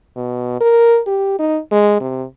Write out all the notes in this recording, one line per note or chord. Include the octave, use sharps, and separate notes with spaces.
B2
A#4
G4
D#4
G#3
C3